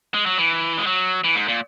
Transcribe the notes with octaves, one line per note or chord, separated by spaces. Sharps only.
G#3
F#3
E3
G#3
F#3
E3
G#2
A#2